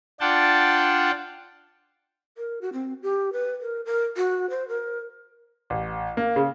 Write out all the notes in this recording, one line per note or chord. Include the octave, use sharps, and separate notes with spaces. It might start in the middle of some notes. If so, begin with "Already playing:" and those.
D4 F4 D5 F#5 G5 A5
A#4
F#4
C4
G4
B4
A#4
A#4
F#4
C5
A#4
A1
A#3
C#3